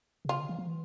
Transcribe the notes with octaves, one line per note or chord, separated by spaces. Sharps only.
C3
C#3 F4
D3
E3
F3
E3